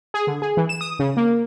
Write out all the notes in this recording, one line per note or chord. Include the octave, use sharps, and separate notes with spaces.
G#4
D3
G#4
E3
E7
D#6
C#3
A#3